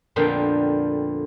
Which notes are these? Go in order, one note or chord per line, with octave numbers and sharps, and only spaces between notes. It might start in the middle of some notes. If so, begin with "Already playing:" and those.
F2 A#2 D3 B3 F5 G5